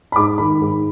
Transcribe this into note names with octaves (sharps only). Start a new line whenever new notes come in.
B5
G#2 D6
D#3 B5
G#2